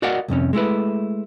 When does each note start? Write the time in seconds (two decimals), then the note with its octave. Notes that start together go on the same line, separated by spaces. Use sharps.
0.02 F#4 A#4 D5 D#5 F5 F#5
0.28 C2 F2 C3 C#4
0.53 G#3 A3 E4 B4